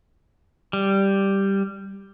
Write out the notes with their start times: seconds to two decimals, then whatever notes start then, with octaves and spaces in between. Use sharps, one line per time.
0.73 G3